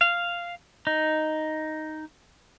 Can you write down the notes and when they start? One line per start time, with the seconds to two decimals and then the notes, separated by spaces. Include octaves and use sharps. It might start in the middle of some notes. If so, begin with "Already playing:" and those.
0.01 F5
0.87 D#4